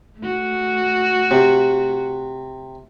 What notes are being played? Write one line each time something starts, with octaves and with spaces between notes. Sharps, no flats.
A3 F#4
C3